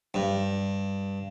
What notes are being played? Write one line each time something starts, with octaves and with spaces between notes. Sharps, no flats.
G2